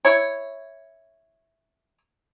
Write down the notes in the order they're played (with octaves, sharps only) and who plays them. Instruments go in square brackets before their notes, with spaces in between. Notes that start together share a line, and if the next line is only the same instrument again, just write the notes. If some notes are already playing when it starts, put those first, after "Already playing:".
[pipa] E4 C#5